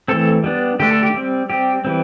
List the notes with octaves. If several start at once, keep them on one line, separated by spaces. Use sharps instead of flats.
E3 A3 C4 A4
G3 B3 D4
D3 A3 D4 G4
A4
G4
G3 C4
G3 C4 G4
E3 G3 C4